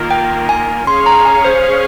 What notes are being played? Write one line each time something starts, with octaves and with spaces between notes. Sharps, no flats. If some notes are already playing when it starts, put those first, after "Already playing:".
Already playing: D#3 A#3 F4 A#4
G5
G#5
C#4 G#4 C#5 F5 C6
A#5
G#5
C5